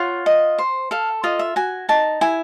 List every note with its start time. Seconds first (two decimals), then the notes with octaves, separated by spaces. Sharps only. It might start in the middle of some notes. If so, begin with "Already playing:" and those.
Already playing: F4 C#5 F#5
0.26 D#5
0.59 C5
0.91 A4 F5
1.24 F4 D#5
1.39 E5
1.56 F#4 G#5
1.89 D#4 A5
2.21 E4 G#5